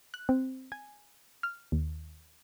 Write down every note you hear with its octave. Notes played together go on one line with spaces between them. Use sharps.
F#6
C4
G#5
F6
D#2